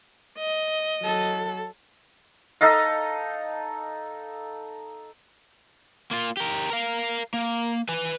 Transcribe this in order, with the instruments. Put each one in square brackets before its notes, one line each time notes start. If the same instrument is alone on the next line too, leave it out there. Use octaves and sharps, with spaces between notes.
[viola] D#5
[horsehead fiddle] F#3 A4
[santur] D#4 A4 D#5 F5
[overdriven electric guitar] A#3 F4
G4 A#4
A#4 F5
A#3
B4 G#5